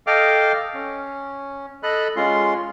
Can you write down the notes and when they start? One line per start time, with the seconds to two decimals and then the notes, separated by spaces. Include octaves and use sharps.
0.07 A4 D#5 F5 G5 D6 F6
0.74 C#4
1.83 A4 D#5 B5 F#6
2.16 G#3 C#4 F4 C6